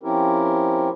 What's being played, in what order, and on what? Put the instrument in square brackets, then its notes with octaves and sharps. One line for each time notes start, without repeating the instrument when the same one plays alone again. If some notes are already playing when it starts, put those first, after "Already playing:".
[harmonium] F3 C4 C#4 E4 G4 A#4